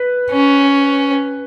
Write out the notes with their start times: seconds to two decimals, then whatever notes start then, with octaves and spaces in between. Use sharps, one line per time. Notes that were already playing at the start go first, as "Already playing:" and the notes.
Already playing: B4
0.32 C#4